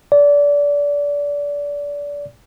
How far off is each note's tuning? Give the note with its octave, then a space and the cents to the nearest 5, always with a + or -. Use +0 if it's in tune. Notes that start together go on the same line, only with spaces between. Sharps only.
D5 -25